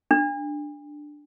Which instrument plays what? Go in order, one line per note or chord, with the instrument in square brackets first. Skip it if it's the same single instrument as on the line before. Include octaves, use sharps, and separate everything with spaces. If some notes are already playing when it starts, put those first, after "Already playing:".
[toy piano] D4